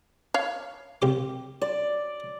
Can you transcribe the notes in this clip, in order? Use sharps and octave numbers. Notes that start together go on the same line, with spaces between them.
C#5 F5
C2 G4 D6
D5